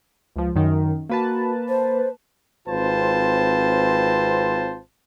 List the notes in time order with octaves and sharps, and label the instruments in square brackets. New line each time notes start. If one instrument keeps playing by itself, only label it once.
[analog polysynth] C#2 F3
F#2 D#3
[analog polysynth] A#3 B4 A5 [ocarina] F#4
[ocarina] C5
[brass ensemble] G#1 C4 F4 B4 C5 A5